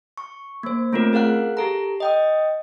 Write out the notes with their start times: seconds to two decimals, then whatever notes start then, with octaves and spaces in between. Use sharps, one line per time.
0.17 C#6
0.63 A#3 C5
0.93 A3 C4 C#4 F4 A#4
1.13 G#4 A#4 F5 F#5 F#6
1.57 G4 A4 A#5
2.00 D#5 G5 D#6